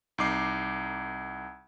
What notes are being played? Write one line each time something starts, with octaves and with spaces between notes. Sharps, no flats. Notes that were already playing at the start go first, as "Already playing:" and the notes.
C2 D#4 D6 C7